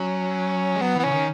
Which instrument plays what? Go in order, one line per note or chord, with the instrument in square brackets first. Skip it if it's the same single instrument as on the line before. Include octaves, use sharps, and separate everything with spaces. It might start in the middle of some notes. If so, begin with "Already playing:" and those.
Already playing: [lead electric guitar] F#3 [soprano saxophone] C#4
[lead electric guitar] G#3
[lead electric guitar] F#3 [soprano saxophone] B3
[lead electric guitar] E3 [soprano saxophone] B3
[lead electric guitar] C#3 [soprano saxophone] C#4
[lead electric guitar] D#3